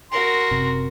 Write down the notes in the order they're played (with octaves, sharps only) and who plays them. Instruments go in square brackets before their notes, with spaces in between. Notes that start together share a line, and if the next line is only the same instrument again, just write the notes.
[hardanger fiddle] F#4 A#4 [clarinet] C6
[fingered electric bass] F#1 C3